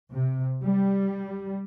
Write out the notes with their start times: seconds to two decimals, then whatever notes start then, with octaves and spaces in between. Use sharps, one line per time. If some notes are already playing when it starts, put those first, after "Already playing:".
0.13 C3
0.64 G3